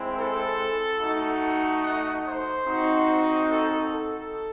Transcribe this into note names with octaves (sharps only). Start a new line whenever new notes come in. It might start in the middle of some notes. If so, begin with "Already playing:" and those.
Already playing: G#3 C4 E4
A4
A3 D#4 F#4
F#5
C5
C4 D#4 F#4
A4
A4